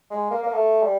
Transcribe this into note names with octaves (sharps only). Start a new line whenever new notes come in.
G#3
A#3
A#3
A3
G3